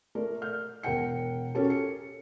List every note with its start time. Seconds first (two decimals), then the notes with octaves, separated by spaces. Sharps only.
0.15 A3 A#4 D5
0.42 F6 G6
0.83 E1 A#4 F#5 G5 C#7
1.55 C#4 F#4 G4 A4 A#4
1.70 C#7